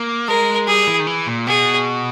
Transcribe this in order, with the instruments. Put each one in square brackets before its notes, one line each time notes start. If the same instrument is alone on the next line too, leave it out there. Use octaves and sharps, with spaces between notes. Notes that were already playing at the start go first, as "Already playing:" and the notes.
Already playing: [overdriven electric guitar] A#3
[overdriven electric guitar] G#3 [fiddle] A#4
[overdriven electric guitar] G3 [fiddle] G#4
[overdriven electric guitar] E3
D#3
E3
A#2
[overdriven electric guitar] B2 [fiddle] G#4